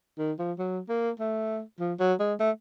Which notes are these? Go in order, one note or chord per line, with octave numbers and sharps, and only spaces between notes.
D#3
F3
F#3
A#3
A3
F3
F#3
G#3
A3